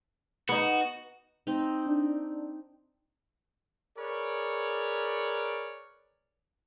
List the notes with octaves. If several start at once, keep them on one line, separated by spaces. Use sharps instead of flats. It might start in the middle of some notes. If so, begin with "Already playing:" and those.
B3 D#4 F#4
C4 D#4
D4
G#4 A#4 B4 C#5 D5